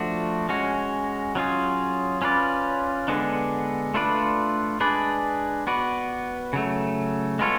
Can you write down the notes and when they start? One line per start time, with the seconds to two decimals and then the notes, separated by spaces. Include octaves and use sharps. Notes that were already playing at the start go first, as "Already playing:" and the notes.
Already playing: F3 A3 D4 F#4
0.49 G#3 C#4 F#4
1.35 F#3 C#4 F4 G#4
2.22 C#4 F4 B4 D5
3.08 D3 G#3 B3 D4
3.94 A3 D4 F4 B4 D5
4.81 G#3 D4 G#4 B4 D5
5.67 B3 F#4 B4 D5
6.53 C#3 F#3 A3
7.39 G#3 B3 F4 A4 C#5